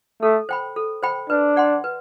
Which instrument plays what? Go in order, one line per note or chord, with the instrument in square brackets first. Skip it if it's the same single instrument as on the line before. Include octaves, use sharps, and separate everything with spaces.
[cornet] A3 [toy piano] A4
[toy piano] C5 G5 B5
A4
C5 G5 B5
[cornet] D4 [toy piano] B4
[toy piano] D5 F#5 C6
B4